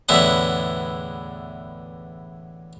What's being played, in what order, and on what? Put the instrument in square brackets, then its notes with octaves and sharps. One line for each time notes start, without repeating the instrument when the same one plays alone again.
[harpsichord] E2 A2 D3 B3 E4 F#5